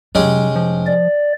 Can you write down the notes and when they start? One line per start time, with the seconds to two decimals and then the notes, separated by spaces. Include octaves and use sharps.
0.15 F1 F#3 G#3 A3 C#4 G4
0.56 F3
0.87 D5